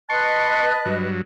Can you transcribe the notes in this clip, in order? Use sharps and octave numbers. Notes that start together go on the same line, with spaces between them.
B4 D#5 A5 C6 C#6 F#6
G2 F#3